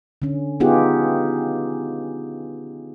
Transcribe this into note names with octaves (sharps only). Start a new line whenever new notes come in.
D3 C#4
B3 D#4 F4 G4 G#4 F#5